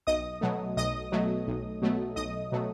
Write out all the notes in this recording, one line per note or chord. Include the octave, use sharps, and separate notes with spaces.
B1 D#5 D#6
B2 F#3 A3
B1 D#5 D#6
B2 F#3 A3
B1
B2 F#3 A3
B1 D#5 D#6
B2 F#3 A3